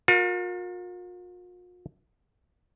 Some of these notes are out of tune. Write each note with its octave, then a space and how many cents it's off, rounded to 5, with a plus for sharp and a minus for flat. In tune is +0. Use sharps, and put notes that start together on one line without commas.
F4 +45 A#4 +0